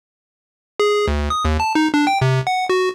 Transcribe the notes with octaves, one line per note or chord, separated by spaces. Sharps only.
G#4
D2
D#6
D#2
A5
D#4
D4
G5
C3
F#5
F#4